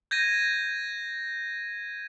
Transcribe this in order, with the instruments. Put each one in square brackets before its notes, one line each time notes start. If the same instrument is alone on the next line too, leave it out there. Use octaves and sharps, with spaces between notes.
[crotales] G6 G#6 A#6 D#7